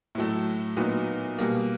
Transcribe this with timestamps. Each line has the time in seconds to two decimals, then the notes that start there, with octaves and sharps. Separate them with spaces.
0.15 A2 F#3 A3
0.76 A#2 F#3 B3 D#4 F#4
1.38 B2 G3 A#3